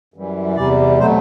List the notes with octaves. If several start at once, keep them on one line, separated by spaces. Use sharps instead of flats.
F#2 E3 G3
E2 C3 G3 D5
B2 F#3 A3 C5